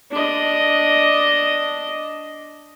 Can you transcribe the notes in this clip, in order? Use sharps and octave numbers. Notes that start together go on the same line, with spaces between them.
D4 D#5